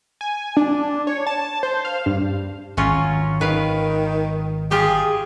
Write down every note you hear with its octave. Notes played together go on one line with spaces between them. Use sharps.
G#5
D4
C#5
A5
C5
F5
G2
G#1 F#3 C#4 F4
D#3 B4 F5
F4 G4 G#4 G5